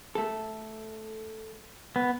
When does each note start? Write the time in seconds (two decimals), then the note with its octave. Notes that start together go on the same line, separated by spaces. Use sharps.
0.15 A3 A4
1.96 B3